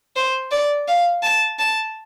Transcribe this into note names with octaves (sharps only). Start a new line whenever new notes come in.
C5
D5
F5
A5
A5